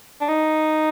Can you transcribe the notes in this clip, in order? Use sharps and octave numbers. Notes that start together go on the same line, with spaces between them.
D4
D#4